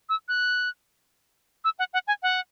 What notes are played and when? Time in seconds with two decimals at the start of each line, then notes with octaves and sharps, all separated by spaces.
0.09 E6
0.28 F#6
1.64 E6
1.79 F#5
1.93 F#5
2.08 G#5
2.23 F#5